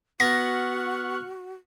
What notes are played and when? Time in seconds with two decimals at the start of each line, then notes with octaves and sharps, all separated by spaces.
0.20 B3 F#4 C#6 F6 F#6 A#6